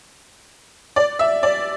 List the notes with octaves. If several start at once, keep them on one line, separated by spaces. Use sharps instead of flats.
D5
E5
D5